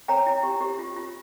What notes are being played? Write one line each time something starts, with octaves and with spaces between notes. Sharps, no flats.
C#5 G5 A#5
E4
G4
G4
F4
F4